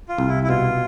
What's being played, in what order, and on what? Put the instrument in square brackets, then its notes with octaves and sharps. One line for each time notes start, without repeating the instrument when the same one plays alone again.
[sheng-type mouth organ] F4
[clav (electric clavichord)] C2
[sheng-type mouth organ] E4
E4
[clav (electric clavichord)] B2 [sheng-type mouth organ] F4